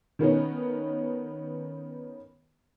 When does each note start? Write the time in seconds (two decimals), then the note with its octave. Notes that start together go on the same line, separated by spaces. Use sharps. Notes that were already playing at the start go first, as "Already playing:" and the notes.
0.19 D#3 B3 C#4 D#4